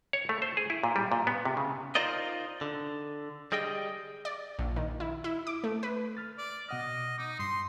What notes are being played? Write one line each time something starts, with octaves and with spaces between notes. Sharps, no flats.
C#5
A3
C5
G#4
E4
A#2
G3
A#2
B3
C3
C#3
D#4 F4 A#4 C5 D5 D#5
D3
G3 G#4 D#5 G5
D5
A#1
D#3
E4
E4
D6
A3
B4
F6 A6
D5
B2 D#5 F#5 F6
D#4 D6
G2 C6